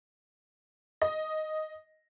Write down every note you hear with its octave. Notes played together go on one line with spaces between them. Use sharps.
D#5